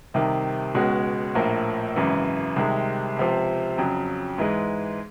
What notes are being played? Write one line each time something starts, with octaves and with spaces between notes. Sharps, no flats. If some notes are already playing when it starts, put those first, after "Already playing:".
C2 C3 D#3
C#2 B2 G#3 C#4 F#4
A#1 A2 F3 A#3
G#1 F#2 C#3 E3
C2 C3 D#3 G#3
C#2 C3 F3
F2 C#3 F#3
G#2 E3 G#3